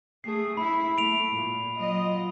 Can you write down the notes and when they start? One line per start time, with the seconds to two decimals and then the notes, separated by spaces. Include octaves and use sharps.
0.24 A3 G#4 C7
0.57 E4 B5
0.98 A3 D7 F7
1.34 A#2
1.77 F#3 F4 D#5